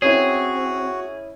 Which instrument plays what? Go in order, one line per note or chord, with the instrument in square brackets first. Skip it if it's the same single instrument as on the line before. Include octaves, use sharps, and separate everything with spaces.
[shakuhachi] C4 [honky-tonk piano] C#4 E4 [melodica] F#4 [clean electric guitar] G#4